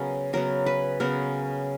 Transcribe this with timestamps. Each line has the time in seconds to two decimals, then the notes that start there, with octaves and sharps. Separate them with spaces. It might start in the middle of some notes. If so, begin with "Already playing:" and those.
Already playing: C#3 F#3 B3 A#4
0.33 C#3 F#3 B3 A#4
0.66 B4
1.00 C#3 F#3 B3 A#4